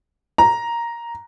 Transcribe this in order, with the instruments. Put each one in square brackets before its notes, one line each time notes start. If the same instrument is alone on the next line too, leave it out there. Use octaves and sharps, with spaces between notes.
[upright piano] A#5